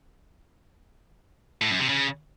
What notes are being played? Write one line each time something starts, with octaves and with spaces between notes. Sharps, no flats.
A2
F#2
C3
C#3